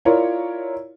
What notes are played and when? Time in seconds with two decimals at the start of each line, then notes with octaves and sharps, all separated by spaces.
0.05 E4 F4 A#4 C#5 D5